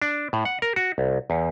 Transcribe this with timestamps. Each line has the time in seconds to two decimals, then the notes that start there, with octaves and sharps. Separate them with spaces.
0.02 D4
0.33 A2
0.45 F#5
0.62 A#4
0.76 F#4
0.98 C2
1.30 E2